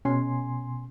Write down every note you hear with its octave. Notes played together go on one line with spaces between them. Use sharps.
B2 C#4 G#5 C6